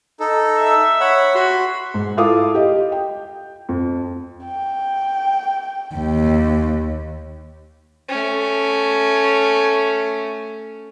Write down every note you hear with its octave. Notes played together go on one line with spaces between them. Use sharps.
D#4 A4
E5
C#5 F#5 B5
F#4 B5 C6
G#2
E4 F4 A4 F5 D6 D#6
G4 D#5
G5
F2
G5
D#2
A3 C#4